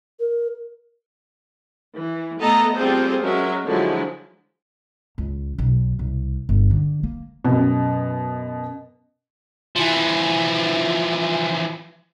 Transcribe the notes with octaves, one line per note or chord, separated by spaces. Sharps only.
A#4
E3
A3 B3 A4 D#5 A#5
G3 C4 F4 G#4 A4 C5
F#3 G#3 C#4 A#4 E5
D3 F3 F#3 G#3 E4
C#2
B1
C2
G1
D3
A#3
F#2 B2
E3 F3